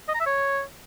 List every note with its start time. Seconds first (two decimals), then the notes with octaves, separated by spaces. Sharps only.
0.08 D#5
0.14 A#5
0.20 E5
0.26 C#5